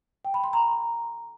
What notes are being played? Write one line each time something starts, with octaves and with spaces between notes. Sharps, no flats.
G5
B5
C6
A#5